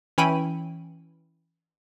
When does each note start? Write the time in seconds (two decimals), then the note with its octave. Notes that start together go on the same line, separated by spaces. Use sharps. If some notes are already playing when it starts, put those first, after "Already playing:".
0.18 E3 C#4 G5 B5 D#7